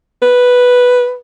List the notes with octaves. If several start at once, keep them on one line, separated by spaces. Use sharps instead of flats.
B4